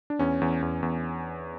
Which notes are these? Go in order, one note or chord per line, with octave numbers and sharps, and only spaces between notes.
D4
E2 C#4
E2
E2
E2